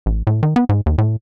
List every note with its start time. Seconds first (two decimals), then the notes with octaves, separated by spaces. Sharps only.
0.06 A1
0.27 A2
0.43 D#3
0.56 B3
0.69 G#2
0.86 D#2
0.98 A2